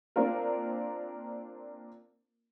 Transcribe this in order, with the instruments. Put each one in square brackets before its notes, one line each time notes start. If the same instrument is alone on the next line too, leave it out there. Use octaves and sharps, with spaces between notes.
[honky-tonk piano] A#3 C4 D4 F4 A#4